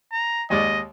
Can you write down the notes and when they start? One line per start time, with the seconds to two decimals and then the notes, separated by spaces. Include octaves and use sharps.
0.12 A#5
0.50 D#2 G#3 D5 D#5